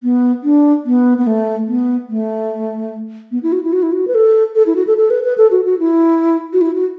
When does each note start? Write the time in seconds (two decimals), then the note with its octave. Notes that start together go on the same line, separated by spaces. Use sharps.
0.03 B3
0.43 D4
0.86 B3
1.18 B3
1.27 A3
1.67 B3
2.09 A3
3.31 B3
3.43 E4
3.52 F#4
3.63 E4
3.73 F#4
3.83 E4
3.92 F#4
4.07 B4
4.14 A4
4.55 A4
4.66 E4
4.76 F#4
4.87 A4
4.97 A4
5.10 B4
5.24 B4
5.38 A4
5.51 F#4
5.66 F#4
5.79 E4
6.53 F#4
6.61 E4
6.75 F#4